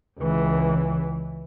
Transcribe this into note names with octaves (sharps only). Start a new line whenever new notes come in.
C#2 E3